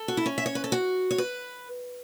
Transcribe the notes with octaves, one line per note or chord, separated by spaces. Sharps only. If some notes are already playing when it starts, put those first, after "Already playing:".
Already playing: A4
F#4
E4
C#4
E5
C#5
B4
A4
F#4
C#5
B4